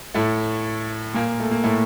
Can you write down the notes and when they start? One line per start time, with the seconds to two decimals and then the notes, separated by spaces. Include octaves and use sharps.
0.14 A2 A3
1.14 A#2 A#3
1.40 A3
1.51 A#3
1.63 A2 A3